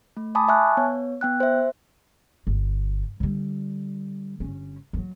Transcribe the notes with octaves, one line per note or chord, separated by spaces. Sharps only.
A3
G#5 A5 B5 D6 D#6
E5 G#5 A5 C#6 F6 F#6
B3 C#5
B3 G5 F#6
C5 E5
G1
D3 G3
G1 C#4
F3 F#3